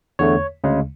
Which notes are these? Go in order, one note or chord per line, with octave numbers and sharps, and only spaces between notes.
E2 D3 A3 C#5
D2 C#3 G#3